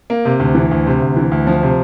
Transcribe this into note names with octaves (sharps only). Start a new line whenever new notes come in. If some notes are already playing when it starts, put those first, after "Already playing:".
A#3
C3
D2
E3
D2
C3
D2
E3
D2
F3
C3